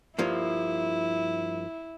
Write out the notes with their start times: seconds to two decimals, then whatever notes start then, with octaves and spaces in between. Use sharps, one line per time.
0.19 G2 F3 A#3 E4